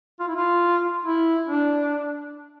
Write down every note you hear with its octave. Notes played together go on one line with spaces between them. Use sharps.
F4
E4
F4
E4
D4